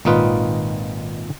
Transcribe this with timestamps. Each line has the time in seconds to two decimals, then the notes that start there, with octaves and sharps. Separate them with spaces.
0.05 G#1 A#2 D#4 F4 B4